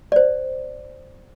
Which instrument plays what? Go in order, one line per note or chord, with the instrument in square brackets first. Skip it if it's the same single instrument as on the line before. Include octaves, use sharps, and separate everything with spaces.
[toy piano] C5 D5